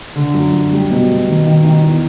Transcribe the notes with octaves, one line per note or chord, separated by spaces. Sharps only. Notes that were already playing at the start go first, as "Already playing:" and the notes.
D3
F#2
F#2
G3
B2
B2
D#3
D#3
D#3
E2